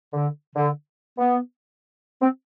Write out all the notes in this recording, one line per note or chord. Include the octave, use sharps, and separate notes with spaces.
D3
D3
B3
C4